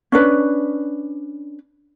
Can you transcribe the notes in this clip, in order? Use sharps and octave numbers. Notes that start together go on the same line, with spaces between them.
C#4 D4 B4